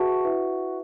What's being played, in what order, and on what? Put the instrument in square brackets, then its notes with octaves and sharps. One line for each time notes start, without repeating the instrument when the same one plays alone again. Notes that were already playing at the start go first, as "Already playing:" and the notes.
Already playing: [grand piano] F#4 [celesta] G#4 B4 E5 A5 C#6
[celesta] E4 B4 E5